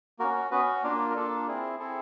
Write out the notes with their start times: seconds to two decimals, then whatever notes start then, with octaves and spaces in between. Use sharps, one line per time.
0.19 A#3 C#4 F#4 A#4
0.51 B3 C#4 F#4 B4
0.83 A#3 D4 F4 A#4
1.10 A#4
1.16 A#3 D4 F4 A4
1.48 C4 E4 G#4
1.79 C4 E4 G#4 A4